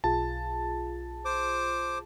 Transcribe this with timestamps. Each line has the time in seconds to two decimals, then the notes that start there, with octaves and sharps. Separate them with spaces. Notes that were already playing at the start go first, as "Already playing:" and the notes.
0.04 B1 F4 G#4 A5
1.25 C5 D6